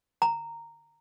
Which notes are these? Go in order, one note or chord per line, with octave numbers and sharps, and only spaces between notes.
A#5